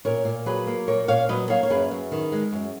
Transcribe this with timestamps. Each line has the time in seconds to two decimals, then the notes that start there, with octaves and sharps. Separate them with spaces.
0.05 A#2 A#4 C#5
0.25 A#2
0.46 F#3 G#4 B4
0.67 A#3
0.87 A#2 A#4 C#5
1.08 A#2 C#5 F5
1.29 F#3 B4 D#5
1.50 A#3 C#5 F5
1.63 C#5
1.70 F#2 G#4 B4
1.91 F#2
2.12 D#3
2.32 G#3
2.53 F#2